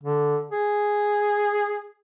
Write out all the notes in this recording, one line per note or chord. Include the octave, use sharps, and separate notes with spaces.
D3
G#4